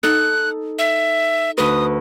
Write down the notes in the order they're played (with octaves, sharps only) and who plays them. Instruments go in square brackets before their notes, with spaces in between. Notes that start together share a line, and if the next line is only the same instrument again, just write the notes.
[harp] D#4 A4 [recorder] F#6
[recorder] E5
[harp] D2 B4 [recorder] D#6